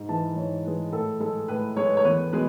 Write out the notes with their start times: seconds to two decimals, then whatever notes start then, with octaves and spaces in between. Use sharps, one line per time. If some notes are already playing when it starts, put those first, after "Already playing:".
Already playing: G#2
0.09 E3 G#3 A5
0.36 G#2 C#5
0.65 E3 G#3 B4
0.93 A2 A4
1.20 G#3 A4
1.48 A2 B4
1.77 G#3 C#5
1.97 C#5
2.05 E2 B4
2.33 B2 G#3 B4